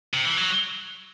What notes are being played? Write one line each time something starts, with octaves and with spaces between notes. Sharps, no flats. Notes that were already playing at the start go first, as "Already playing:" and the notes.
C3
E3
F#3